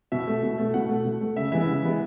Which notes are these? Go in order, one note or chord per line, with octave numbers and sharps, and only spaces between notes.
B2 E5
A3
B2
A3
B2 F#5
A3
B2
A3
C#3 E5
E3 G#3 B3 E5
C#3
E3 G#3 B3